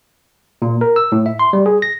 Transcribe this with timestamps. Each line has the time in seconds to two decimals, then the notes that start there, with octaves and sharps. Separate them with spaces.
0.62 A#2
0.81 A#4
0.96 E6
1.12 A2
1.26 E5
1.39 C6
1.53 G3
1.66 G#4
1.82 A#6